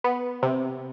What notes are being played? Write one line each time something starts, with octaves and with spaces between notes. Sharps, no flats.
B3
C3